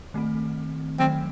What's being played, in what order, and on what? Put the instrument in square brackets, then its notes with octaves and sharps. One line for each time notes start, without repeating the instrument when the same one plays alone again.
[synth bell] D#3 A3 C4
[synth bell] D#3 F#3 A3 [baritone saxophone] C4